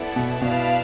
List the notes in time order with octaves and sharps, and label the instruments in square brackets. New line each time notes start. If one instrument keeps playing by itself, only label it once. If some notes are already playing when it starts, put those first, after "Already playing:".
Already playing: [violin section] B3 E4 A4 D5
[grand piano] B2
[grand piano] B2 [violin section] E4 B4 D5 F5 A5